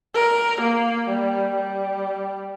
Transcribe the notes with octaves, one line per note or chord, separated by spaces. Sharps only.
A#4
A#3
G3
G3